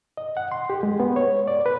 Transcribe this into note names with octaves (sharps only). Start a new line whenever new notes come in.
D#5
F#5
C6
G4
G#3
B3
C#5
D5
B4